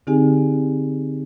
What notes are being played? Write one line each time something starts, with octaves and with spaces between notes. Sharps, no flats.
D3 C4 D#4 G4 G#4 G#5